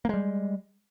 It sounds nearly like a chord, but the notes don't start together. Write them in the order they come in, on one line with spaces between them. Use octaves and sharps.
A#3 G#3 G3